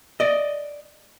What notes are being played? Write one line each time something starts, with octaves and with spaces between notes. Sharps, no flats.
D5 D#5